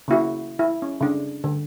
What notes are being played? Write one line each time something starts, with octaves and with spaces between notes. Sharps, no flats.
C#3 A#3 E4 F#4
E4
C#4
C#3 D4
D3